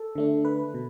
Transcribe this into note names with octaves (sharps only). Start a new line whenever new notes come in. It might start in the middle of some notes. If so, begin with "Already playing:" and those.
Already playing: A4
D3 A3 D4
B4
B2